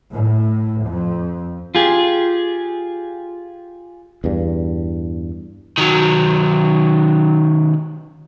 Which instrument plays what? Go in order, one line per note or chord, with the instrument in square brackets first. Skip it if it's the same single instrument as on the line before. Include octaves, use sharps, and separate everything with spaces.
[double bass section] A2
F2
[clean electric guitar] F4 G4 G#4
[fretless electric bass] E2 G2
[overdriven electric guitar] D#3 F#3